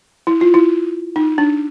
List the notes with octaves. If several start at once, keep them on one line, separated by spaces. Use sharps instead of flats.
E4
F4
E4
D#4
D4